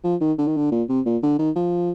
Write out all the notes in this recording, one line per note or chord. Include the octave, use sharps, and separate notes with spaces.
F3
D#3
D3
D#3
D3
A#2
C3
A#2
D3
D#3
F3